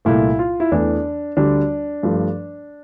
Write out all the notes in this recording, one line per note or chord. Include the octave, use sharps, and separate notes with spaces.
C2 A#2 A3 E4
F4
E4
E2 E3 A3 D4
D2 D3 G3 D4
G2 F3 A3